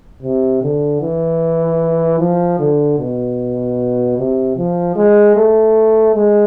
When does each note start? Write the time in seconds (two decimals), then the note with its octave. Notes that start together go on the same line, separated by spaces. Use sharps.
0.23 C3
0.62 D3
1.01 E3
2.20 F3
2.59 D3
2.99 B2
4.18 C3
4.57 F3
4.96 G#3
5.36 A3
6.15 G#3